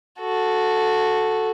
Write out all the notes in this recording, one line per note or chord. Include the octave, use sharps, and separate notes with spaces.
F#4 A4